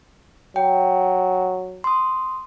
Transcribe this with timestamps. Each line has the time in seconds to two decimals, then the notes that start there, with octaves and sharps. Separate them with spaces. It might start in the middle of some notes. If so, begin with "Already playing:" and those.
0.56 F#3 G5
1.84 C6 D#6